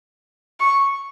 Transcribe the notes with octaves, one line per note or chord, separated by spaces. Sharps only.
C#6